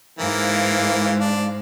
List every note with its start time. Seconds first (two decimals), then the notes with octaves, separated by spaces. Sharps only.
0.19 G#2 E3 A#3 C5 F5
1.20 D4